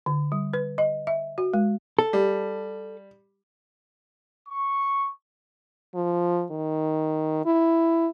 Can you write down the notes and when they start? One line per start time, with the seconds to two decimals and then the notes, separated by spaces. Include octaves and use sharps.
0.06 D3
0.32 G3
0.54 B4
0.78 D#5
1.07 E5
1.38 F#4
1.53 G#3
1.99 A4
2.13 G3
4.49 C#6
5.95 F3
6.51 D#3
7.46 E4